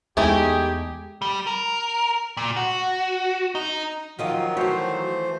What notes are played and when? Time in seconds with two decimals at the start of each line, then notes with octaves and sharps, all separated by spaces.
0.17 E2 G#3 A3 D#4 E4 G4 G#4
1.22 G3
1.47 A#4
2.37 A#2
2.56 F#4
3.55 D#4
4.19 D#3 F3 F#3 F4 D#5
4.57 E3 F3 A3 F#4 C5 C#5